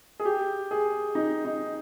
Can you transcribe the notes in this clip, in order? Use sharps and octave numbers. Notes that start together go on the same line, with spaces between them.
G#4
G4
G#4
D#4
D#4